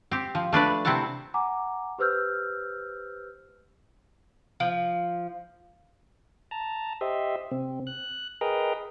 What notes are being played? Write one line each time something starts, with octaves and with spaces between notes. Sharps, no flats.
C4 G4
F3
A3 D4 B4 D5
C3 C4 E4 A4 F#5 A5
F#5 G#5 A#5 D6
G4 B4 C5 E6 F6 G6
F3
A5 A#5
G4 C5 D#5 E5
C3 C4
F#6
G#4 A#4 B4 D#5 G5 A#5